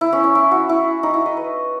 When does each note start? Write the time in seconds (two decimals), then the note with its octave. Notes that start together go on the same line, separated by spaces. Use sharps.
0.01 E4
0.13 C#4
0.24 C#4
0.35 E4
0.51 F#4
0.69 E4
1.03 D#4
1.14 E4
1.26 D#5
1.37 B4